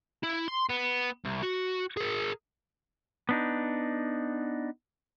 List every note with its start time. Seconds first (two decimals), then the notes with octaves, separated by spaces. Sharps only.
0.23 E4
0.48 C6
0.70 B3
1.25 C2
1.43 F#4
1.97 G#4 A#4
3.29 B3 D4 D#4